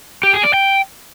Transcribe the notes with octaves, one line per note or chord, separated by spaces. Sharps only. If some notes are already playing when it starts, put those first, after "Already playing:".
G4
G#4
D5
G5